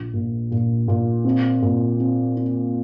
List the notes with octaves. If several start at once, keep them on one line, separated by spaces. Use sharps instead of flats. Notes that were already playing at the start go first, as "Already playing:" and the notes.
Already playing: A#1
A#2
A#2
A#2
C4
A#2
C4
C4